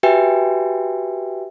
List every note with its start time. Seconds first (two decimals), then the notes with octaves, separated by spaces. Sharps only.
0.03 F#4 G4 B4 E5 G5 G#5